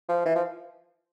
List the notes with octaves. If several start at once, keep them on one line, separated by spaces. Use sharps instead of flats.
F3
E3
F3